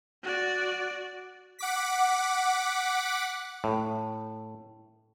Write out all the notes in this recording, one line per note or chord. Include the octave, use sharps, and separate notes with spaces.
F#4 D5
F#5 D6 B6
A2